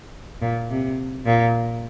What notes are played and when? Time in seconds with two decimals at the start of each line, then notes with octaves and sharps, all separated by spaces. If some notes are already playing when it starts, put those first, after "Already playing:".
0.42 A#2
0.70 C3
1.26 A#2